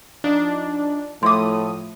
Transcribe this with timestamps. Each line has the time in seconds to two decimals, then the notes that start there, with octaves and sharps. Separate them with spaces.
0.24 F3 D4 D#4
1.23 A2 F3 A3 C6 D6 D#6